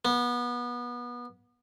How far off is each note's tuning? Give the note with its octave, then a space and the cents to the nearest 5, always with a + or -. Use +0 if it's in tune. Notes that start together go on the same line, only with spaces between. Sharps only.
B3 -25